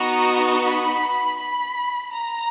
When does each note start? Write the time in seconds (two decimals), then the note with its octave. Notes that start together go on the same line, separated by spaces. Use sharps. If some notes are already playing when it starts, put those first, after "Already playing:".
Already playing: B3 D#4 F#4 A#5
0.64 B5
1.38 B5
2.13 A#5